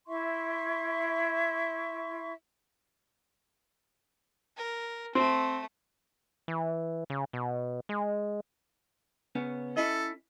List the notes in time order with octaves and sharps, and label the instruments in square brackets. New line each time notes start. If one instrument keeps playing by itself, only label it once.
[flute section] E4 E5 C6 C#6
[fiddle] A#4
[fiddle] A3 [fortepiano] C4
[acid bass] E3
C#3
B2
G#3
[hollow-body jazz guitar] C#3 B3 C#4
[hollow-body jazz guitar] C#4 E4 D#5 [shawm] A4